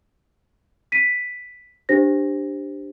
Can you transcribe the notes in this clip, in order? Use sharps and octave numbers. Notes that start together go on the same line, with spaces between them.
B6 D#7
D4 G4 C5 A#6